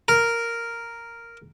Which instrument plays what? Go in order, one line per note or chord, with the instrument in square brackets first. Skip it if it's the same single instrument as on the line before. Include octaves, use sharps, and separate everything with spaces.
[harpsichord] A#4